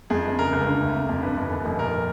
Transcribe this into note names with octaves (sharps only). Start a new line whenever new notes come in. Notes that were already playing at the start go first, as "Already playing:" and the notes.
F2 G#4
G1
C#3 A#4
C#2
D3
D2
C3
F2
G2 B4
G1
D#2
F1
A#2 A#4